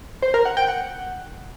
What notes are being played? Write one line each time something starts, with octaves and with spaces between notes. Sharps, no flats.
C5
A#4
F#5
G5
F#5